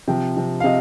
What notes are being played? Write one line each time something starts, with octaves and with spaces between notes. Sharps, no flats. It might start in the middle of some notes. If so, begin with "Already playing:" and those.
C3 F3 G5
C3 F3
F5
C3 D#5